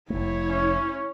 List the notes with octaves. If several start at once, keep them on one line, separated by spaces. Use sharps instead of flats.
F1 A3 E4 C#5
C#4